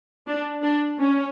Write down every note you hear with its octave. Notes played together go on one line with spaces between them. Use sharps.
D4
D4
C#4